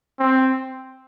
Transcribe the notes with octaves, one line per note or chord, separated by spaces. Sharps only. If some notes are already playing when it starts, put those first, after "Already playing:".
C4